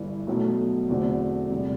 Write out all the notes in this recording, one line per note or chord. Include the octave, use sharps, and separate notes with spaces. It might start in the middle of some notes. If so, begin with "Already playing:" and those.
Already playing: G1 G2 E3
B1 B2 F#3 A3
E2 D3 A3 C4 F#4
E2 C3 G3